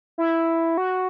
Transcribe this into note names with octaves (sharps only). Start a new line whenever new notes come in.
E4
F#4